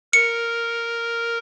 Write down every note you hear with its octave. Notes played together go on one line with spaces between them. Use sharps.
A#4 C#7